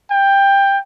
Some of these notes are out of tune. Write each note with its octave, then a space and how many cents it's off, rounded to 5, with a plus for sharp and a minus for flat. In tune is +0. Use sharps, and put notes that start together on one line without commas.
G5 +15